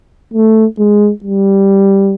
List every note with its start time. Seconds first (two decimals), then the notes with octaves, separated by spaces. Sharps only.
0.34 A3
0.79 G#3
1.24 G3